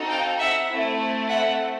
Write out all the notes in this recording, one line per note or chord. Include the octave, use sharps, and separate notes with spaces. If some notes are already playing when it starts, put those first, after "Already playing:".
Already playing: C4 D#4 F#4 A4
F5 G5
E5 F#5
A3 C4 E4
E5 F#5